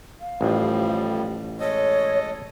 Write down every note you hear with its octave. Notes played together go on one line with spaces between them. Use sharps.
F5
A1 A2 F3 G3
G#3 A4 C#5 D#5